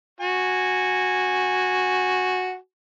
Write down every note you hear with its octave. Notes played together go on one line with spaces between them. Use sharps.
F#4 G#5